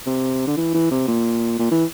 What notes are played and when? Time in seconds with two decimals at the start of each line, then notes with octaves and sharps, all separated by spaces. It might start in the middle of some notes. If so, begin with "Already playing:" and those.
0.06 C3
0.47 D3
0.57 E3
0.74 E3
0.91 C3
1.08 A#2
1.59 A#2
1.71 E3